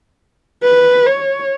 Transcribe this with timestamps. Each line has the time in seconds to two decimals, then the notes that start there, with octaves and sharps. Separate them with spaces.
0.63 B4
1.06 C#5